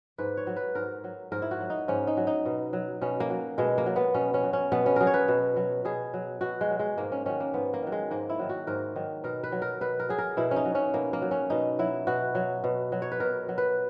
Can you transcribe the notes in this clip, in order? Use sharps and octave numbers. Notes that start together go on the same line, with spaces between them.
G#2 B4
C#5
F#3
B4
G#2 A#4
F#3
G#2 A#4
E4
F#4
F#3
D#4
G#2 C#4
D#4
F#3
D#4
B2
F#3
B2 C#4
A#3
F#3
B2 G#3
A#3
F#3
B3
B2 C#4
C#4
F#3
C#4
B2 B3
C#4
F#3 G#4 A#4
C#5
B4
B2
F#3
B2 G#4
F#3
B2 F#4
G#3
F#3
G#3
G#2 A#3
C#4
D#3 F#3 C#4
A#3
G#2 B3
A#3
D#3 F#3
G#3
G#2 A#3
E4
D#3 F#3
F#4
G#2 A#4
D#3 F#3
B2 A#4
B4
F#3
A#4
B2 B4
A#4
F#3 G#4
A#4
B2 E4
C#4
D#4
F#3
C#4
B2 A#3
A#3
F#3
C#4
B2 D#4
F#3 E4
B2 F#4
F#3
B2
F#3
C#5
B4
B2 A#4
F#3
B4